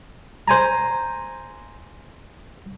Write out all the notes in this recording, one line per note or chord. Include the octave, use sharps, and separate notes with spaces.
C5 G#5 A#5